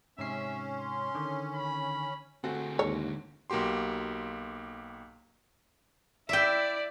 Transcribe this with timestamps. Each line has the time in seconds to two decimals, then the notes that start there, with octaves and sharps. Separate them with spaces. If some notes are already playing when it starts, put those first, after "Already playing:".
0.19 G#2 C3 C#4 E5 C7
0.78 C6
1.15 D3 D#3
1.55 B5
2.44 D2 A3 C4 F#4 G#4
2.79 D#2 G#2 D3 C#5
3.50 B1 A#3 F#4 G4 C6
6.29 E4 D5 E5 G5